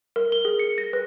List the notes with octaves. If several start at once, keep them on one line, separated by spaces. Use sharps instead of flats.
A#4
G7
G#4
C#7
A#6
B4